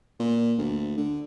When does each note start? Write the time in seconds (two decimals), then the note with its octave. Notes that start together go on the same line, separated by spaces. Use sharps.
0.20 A#2
0.58 D2
0.97 D3